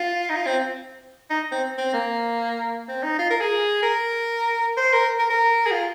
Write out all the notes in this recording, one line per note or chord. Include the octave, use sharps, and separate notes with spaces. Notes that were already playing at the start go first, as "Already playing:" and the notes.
Already playing: F4
D#4
F4
C4
D#4
C4
C4
A#3
C4
D#4
F4
A#4
G#4
A#4
C5
A#4
A#4
A#4
G#4
F4